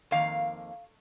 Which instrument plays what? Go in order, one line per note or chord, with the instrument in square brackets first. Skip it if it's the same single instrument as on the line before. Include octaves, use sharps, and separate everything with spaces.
[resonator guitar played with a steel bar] F2 D#3 A#3 F5